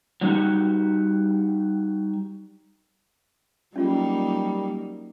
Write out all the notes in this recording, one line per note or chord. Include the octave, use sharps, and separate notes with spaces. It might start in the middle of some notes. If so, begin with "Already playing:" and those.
F#3 G3 D#4 F#4 G4
F#3 G3 A#3 C#4 D#4 F4 G#4